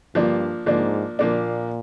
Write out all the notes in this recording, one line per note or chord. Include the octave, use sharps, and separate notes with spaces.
G2 F3 A#3 D4
G#2 F3 A#3 D4
A#2 F3 A#3 D4